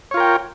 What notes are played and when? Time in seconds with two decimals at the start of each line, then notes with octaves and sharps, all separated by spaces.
0.11 C#5
0.14 F4
0.17 A#4
0.20 G5